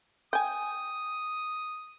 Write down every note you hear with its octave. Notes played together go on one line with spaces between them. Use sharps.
G5 G#5 D#6